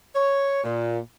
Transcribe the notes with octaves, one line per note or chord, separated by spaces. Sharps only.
C#5
A#2